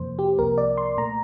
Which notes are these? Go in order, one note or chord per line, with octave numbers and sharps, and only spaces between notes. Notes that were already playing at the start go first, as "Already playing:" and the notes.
Already playing: F2 C3 F3 A#3 C5
G4
C2 C3 F3 A#3 A#4
D5
C6
A#2 A3 A#5